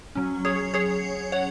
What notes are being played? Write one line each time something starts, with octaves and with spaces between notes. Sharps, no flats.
F#3 C#4
G#4 C#5
G#4 C#5
C#5 F#5